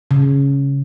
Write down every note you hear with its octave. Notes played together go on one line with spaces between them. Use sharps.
C#3